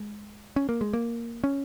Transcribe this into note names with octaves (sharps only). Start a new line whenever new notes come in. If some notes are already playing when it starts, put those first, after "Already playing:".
Already playing: G#3
C#4
A#3
G#3
A#3
C#4